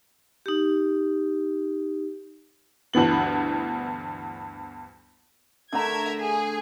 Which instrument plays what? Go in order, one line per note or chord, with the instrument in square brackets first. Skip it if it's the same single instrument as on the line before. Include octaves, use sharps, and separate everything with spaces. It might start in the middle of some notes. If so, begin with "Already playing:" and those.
[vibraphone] D#4 G4
[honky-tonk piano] D2 G2 E3 B3 F#7
[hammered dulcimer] D3 A3 [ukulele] D4 A#5 [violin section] A#4 E5 G#6
[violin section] G#4